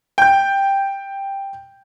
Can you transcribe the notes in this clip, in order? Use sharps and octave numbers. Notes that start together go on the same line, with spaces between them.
G5 G6